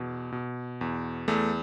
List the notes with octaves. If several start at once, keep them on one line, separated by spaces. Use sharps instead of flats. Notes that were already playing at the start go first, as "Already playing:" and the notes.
Already playing: E2 B2
B2
E2
E2 A3